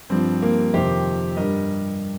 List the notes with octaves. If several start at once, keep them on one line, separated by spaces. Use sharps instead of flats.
G2 F3 C4
A#3
F2 C3 D#3 G4 C5
G2 G3 A#4 D#5